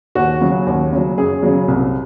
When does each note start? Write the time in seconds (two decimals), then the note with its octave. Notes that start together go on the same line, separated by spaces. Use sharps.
0.15 D#2 F#4
0.41 C#3 F#3
0.66 D#2
0.92 C#3 F#3
1.18 F#2 G#4
1.43 C#3 F#3
1.68 C2